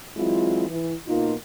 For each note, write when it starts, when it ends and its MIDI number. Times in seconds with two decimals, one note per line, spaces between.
0.17 0.68 52
0.17 0.68 54
0.17 0.68 56
0.17 0.68 60
0.17 0.68 64
0.17 0.68 65
0.69 0.94 52
1.08 1.34 47
1.08 1.34 58
1.08 1.34 63
1.08 1.34 65